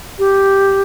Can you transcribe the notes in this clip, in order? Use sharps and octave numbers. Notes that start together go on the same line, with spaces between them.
G4